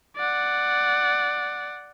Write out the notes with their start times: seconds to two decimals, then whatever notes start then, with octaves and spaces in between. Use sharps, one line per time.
0.16 D5 F#5